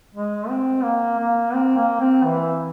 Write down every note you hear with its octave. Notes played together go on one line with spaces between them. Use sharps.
G#3
C4
A#3
A#3
C4
A#3
C4
E3